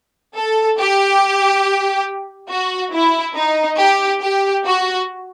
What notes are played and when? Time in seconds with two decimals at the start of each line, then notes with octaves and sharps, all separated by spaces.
0.36 A4
0.79 G4
2.50 F#4
2.92 E4
3.36 D#4
3.78 G4
4.21 G4
4.65 F#4